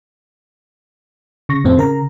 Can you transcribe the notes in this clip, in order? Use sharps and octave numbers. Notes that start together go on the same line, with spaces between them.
C#3 C#6 A#6
F2 A2 C4
C#3 A#4 A#5